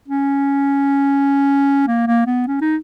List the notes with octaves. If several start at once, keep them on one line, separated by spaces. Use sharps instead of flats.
C#4
A#3
A#3
B3
C#4
D#4